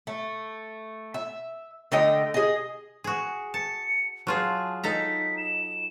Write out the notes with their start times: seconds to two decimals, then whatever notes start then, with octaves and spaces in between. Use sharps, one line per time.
0.07 A3
1.14 E5
1.92 D3 A3 D#5 G5
2.34 G#4 D#5
3.04 F#4 G#4
3.54 A5 C#7
4.27 F#3 F4 G#4 A5
4.83 D#4 A4 A#5 B6
5.37 E7